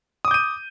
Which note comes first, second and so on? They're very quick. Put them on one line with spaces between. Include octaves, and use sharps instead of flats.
D#6 D6 G6 D#7